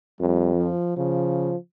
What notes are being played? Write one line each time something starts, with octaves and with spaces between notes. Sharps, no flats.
F2 G3
F3
C#3 F3